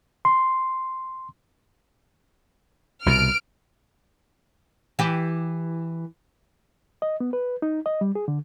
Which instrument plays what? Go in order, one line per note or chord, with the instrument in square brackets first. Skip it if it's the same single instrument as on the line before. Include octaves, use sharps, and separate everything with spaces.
[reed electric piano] C6
[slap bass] C2 B2 [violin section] F6 D7
[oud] E3 G4
[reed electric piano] D#5
B3
B4
D#4
D#5
G3
G#4
D3